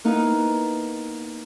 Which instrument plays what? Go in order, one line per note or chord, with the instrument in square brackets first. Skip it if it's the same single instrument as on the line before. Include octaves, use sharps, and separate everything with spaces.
[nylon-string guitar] A#3 B3 D#4 E4